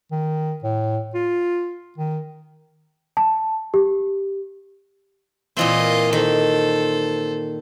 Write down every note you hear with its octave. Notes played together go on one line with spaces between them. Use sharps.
D#3
A2
F4
D#3
A5
G4
A#2 E3 C4 F4 D#5
D#3 A4 C5